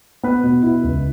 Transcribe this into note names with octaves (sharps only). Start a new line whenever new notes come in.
B3 B4
B2
E4
C#2